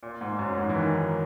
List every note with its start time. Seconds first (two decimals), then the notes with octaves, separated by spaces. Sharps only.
0.03 A#2
0.21 G#2
0.39 F#2
0.57 G#2
0.69 E3
0.75 D#3